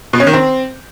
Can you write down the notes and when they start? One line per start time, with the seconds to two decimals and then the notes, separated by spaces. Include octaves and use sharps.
0.13 B2
0.20 C#4
0.27 D#3
0.33 C4